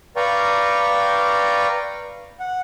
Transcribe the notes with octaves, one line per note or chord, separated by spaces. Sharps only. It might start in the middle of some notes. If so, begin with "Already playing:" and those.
B4 D5 F5 G5 A#5 C#6
F#5